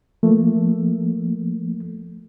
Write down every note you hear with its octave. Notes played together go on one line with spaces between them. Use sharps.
F3 A3 A#3